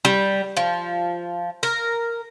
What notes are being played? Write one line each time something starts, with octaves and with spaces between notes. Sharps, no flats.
G3
F3
A#4